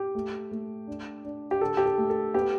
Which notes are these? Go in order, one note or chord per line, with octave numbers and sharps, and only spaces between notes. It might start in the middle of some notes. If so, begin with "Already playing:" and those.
Already playing: G4
A3
A3
D4
D4
G4
D3 A4
G4
A4
A3
A4
B3 G4